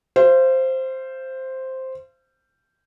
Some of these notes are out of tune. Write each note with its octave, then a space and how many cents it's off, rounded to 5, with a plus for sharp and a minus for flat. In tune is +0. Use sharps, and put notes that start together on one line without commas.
C5 +0 F5 -40